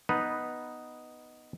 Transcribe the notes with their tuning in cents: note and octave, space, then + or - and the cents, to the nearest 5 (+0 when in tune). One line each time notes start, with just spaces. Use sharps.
B3 +0 D#4 +0 B4 -5